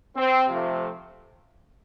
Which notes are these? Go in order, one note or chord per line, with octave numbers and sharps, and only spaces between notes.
C4
C3 F3 A3